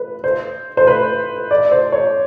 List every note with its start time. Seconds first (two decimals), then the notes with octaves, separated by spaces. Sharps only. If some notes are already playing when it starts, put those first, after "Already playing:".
Already playing: B4
0.24 C5
0.77 C5
0.87 B4
1.51 D5
1.71 C5
1.92 C#5